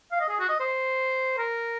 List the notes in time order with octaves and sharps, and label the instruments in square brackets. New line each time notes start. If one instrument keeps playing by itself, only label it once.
[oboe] F5
D#5
G#4
F#4
D#5
C5
A#4